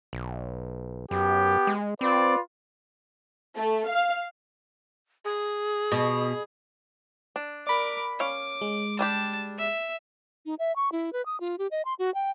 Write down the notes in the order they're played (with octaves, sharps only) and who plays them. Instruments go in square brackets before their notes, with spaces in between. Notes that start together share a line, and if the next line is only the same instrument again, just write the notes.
[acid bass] B1
[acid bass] F#2 [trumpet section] B3 G4
[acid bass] G#3
[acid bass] C4 [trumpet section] F4 B4 D5
[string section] A3
F5
[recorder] G#4
[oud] B2
[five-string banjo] D4
[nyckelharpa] A#4 D6 [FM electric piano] D5 B5
[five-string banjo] C#4 F5 [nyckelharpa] D6
[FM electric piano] G#3
[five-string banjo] G3 D4 G4 [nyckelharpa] A5
[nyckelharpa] E5
[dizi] D#4
E5
C#6
E4
B4
D#6
F4
G4
D#5
C6
F#4
G5